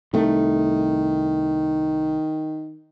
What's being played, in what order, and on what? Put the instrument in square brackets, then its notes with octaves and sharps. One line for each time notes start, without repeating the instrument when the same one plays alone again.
[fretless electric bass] C2 A3 [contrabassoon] D#3